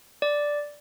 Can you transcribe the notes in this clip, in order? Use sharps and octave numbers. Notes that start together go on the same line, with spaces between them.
D5